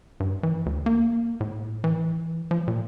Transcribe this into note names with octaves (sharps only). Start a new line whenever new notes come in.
G2
E3
D2
A#3
A2
E3
F3
A#2